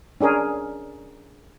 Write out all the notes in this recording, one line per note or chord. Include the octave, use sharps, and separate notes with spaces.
C#4 D4 G#4 A#4